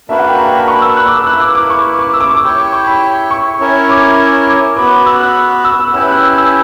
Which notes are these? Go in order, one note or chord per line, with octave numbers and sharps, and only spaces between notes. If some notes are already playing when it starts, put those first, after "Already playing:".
A#3 D4 F#4 B4 E5
F#5
G5
A#5
B5
C#6
E6
F#6
D6
E6
A#3 E4 B4 F#6
D6
D6
C#6
D6
E6
D6
C#6
D6
E4 G4 C#5 G5
C#6
B5
C#6
C#4 E4 A#4 C#5
D6
D6
B3 F#4 B4 D6
E6
F#6
E6
E6
C#4 E4 G4 B4 E6
F#6
E6
E6